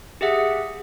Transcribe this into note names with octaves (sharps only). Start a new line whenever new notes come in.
G4 G#4 E5 F#5